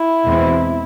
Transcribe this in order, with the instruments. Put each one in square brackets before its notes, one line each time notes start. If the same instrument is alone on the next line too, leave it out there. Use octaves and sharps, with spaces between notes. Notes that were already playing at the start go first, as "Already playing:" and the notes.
Already playing: [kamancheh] E4
[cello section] E2 B2 G#3 C4